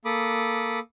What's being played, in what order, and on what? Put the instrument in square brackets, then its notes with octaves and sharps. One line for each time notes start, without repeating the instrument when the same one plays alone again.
[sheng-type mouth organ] A#3 A4 B5 D6 D#6